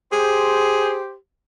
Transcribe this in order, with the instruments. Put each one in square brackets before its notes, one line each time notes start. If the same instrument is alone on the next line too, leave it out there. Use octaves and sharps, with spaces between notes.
[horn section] G4 C5 [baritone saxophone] G#4